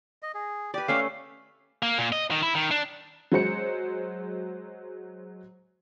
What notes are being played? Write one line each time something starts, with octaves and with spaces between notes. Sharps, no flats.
D#5
G#4
G4 B4 D5
A3 C#4 E5 F5
A#3
A#2
D#5
D#3
E4
D#3
D4
F#3 G#3 C5 C#7